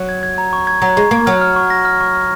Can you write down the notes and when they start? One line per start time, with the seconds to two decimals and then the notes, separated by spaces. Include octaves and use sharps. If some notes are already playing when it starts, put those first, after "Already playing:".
Already playing: F#3
0.09 G#6
0.23 G#6
0.38 A#5
0.53 C#6
0.67 G#6
0.82 F#3 A#5
0.97 G#3 C#6
1.11 A#3 G#6
1.26 F#3 F6
1.41 F6
1.56 C#6
1.70 A#6
1.85 F6
2.01 C#6
2.15 F6